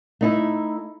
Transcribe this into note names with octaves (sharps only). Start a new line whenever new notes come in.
A3 D#4 E4